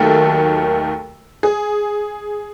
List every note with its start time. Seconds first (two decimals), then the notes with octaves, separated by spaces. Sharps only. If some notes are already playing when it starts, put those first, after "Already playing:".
Already playing: D#2 D#3 F#3 A3 A4
1.43 G#4